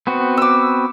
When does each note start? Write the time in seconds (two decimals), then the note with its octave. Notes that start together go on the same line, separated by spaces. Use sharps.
0.07 B3 C4 F#4
0.37 D6 E6